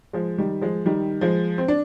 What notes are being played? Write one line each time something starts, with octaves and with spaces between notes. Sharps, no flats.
F3 G#3
D#3 G3
F3 G#3
D#3 G3
F3 G#3
C4
D4